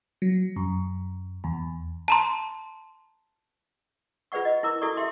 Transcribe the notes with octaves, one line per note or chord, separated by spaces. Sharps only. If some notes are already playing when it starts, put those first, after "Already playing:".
F#3
F#2
E2
A5 A#5 C6
F4 G#4 B4 D5 F#5 C#6
D#5
E4 A#4 D6
E4 F#4 A4 D5 C#6
G4 E5 C6 D6